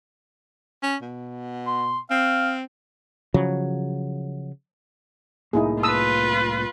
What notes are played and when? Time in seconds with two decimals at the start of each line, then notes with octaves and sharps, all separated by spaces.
0.83 C#4
1.02 B2
1.67 C6
2.10 C4 F5
3.34 C#3 F3 F#3
5.53 C2 A2 A#3 D#4 E4 G#4
5.83 F4 B4 A5 D#6 E6